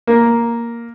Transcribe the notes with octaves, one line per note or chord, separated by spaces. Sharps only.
A#3